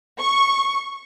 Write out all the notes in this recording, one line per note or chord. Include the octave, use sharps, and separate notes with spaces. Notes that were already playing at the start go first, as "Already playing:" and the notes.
C#6